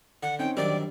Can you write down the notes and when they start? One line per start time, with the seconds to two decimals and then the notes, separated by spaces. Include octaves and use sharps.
0.23 D3 F#5
0.39 C4 C#4 D#4 G5
0.57 F#2 D3 D#3 G3 C4 D5